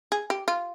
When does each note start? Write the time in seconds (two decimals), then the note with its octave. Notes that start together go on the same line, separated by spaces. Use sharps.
0.12 G#4
0.30 G4
0.48 F4